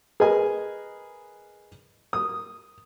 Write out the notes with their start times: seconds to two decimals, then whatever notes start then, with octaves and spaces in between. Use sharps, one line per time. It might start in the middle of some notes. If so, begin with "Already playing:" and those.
0.20 G#4 A#4 B4 D#5 G#5
2.13 D#6